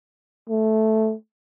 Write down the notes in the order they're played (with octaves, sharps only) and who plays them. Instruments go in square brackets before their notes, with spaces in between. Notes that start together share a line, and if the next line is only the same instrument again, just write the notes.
[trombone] A3